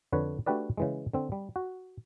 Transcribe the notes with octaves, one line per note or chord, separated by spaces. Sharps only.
F2 D3 B4 C#5
A3 D4 F#4 G4 B4 D5
C#3 E3 G#3
D3 C4
G3
F#4